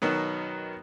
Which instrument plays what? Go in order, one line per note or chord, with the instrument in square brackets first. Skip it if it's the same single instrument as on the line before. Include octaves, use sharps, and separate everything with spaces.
[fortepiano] B2 D#3 F#3 B3